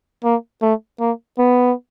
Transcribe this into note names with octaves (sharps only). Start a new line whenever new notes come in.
A#3
A3
A#3
B3